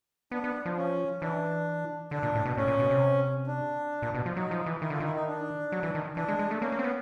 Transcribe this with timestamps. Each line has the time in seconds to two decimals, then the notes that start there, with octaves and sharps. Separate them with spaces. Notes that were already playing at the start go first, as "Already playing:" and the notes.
0.31 B3 D4
0.44 B3
0.65 F3
0.77 C#4
1.22 E3 D4
2.11 D3 D4
2.23 A#2
2.35 A2
2.45 B2
2.57 A2 C#4
2.68 A#2
2.79 B2
2.90 C3
3.47 D4
4.02 A#2
4.15 B2
4.26 F3
4.36 F#3 D#4
4.51 F3
4.66 E3
4.82 D#3 E4
4.90 D3 F4
5.00 D#3 E4
5.16 D#4
5.27 D4
5.72 F#3
5.83 E3
5.95 D#3
6.17 E3 D4
6.28 G#3
6.39 G#3
6.51 A3
6.62 A#3 C#4
6.72 A#3
6.79 C4
6.84 B3